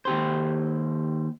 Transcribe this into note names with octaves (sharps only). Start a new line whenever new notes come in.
D#2 G4 C5